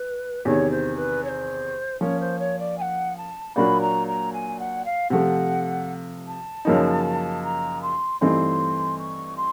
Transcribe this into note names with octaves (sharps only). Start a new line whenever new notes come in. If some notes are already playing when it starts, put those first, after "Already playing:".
Already playing: B4
E2 C3 D#3 C#5
C5
B4
C#5
C5
F3 A#3 C#4 C#5
C5
C#5
D5
G#5
F#5
A5
A#2 F#3 A#3 D4 F#4 B5
A#5
A#5
G#5
F#5
F5
C3 F3 A3 F#5
A5
F#2 C#3 F3 A#3 D#4
A#5
C6
G2 E3 A3 C4 D#4 C6
C#6
C6